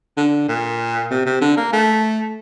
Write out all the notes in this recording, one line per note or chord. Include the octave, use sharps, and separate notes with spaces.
D3
A#2
C3
C3
D3
A#3
A3